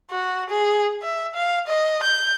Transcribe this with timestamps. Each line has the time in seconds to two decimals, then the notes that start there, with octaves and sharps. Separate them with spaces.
0.11 F#4
0.50 G#4
1.03 E5
1.35 F5
1.67 D#5
2.03 G6